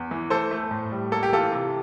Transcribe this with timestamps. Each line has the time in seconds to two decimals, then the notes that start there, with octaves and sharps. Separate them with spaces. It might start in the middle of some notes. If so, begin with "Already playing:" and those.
Already playing: E2
0.11 E3
0.30 A3 A4 C5
0.51 A3
0.71 A2
0.92 G3
1.12 A#3 A4
1.23 G4
1.32 E3 F4 A4
1.52 C3